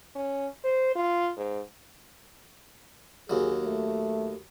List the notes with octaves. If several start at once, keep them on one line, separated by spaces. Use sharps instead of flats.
C#4
C5
F4
G#2
D#2 F#3 G#4
A3